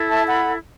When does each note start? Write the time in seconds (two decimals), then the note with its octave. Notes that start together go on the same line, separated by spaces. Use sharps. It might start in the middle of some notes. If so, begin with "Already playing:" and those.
Already playing: E4 A4
0.10 E5 A5
0.28 F#5 B5